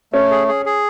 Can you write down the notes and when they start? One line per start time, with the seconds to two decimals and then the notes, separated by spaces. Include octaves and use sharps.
0.13 A3 C#4
0.31 G#4
0.48 G#4
0.66 G#4